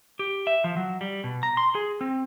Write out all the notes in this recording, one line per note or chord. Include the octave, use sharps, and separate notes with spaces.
G4
E5
F3
F#3
G3
B2
A#5
C6
G#4
C4